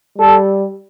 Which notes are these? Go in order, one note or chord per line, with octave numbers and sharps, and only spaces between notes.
G3 A4